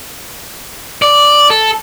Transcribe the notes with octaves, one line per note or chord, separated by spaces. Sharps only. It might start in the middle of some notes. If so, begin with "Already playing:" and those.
D5
A4